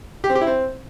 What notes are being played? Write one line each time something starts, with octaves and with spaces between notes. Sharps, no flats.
G4
C4
G4
E4
C4